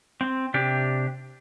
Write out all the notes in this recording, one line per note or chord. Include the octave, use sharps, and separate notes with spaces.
C4
C3 D4 G4